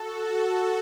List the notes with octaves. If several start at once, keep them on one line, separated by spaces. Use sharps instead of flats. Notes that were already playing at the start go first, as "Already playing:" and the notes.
Already playing: F#4 A4
A4